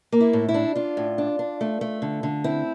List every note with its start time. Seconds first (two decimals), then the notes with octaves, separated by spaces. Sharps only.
0.12 A#3
0.20 E4
0.33 A2
0.49 E4
0.54 D4
0.75 D4 F4
0.97 A2
1.18 D4
1.39 D4
1.61 A3
1.81 A3
2.02 D3
2.23 D3
2.44 C4 E4